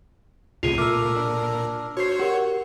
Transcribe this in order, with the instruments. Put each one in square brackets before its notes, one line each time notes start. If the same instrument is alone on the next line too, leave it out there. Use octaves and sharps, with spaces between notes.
[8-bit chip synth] C#2 A2 C3 [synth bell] F4 G#4 D#7
[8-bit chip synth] A#2 A#4 [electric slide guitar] A3 [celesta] D6 [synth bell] E6 F6
[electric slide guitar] D4
[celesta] F#4 C7 [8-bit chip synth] C5 C#5
[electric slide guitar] F#4 [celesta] G4 A#4 F#5